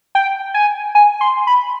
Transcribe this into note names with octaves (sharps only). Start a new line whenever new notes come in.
G5
G#5
G#5
C6
B5